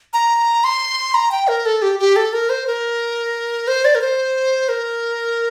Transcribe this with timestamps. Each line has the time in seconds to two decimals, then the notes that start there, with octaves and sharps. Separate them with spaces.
0.13 A#5
0.64 C6
1.14 A#5
1.32 G5
1.48 A#4
1.66 A4
1.82 G4
1.99 G4
2.16 A4
2.33 A#4
2.50 C5
2.67 A#4
3.68 C5
3.85 D5
3.95 A#4
4.01 C5
4.69 A#4